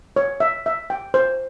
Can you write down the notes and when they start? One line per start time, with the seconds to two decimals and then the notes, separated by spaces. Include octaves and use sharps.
0.16 C#5
0.40 E5
0.66 E5
0.90 G5
1.14 C5